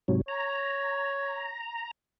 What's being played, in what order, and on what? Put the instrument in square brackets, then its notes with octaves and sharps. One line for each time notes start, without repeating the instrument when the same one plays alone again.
[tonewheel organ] G#2 C3 F#3
[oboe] C#5 [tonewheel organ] A#5